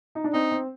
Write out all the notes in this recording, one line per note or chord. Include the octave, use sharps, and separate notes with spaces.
D#4
D4
C4 D#4
C4